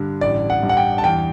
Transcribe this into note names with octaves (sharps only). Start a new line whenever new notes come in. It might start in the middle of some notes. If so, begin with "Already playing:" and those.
Already playing: G2 D3
A1 D5
F#5
G2
F#5
G5
A5
E2 G5